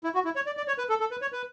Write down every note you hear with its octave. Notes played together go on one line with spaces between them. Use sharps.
E4
F#4
E4
C#5
D5
D5
C#5
B4
A4
A4
B4
C#5
B4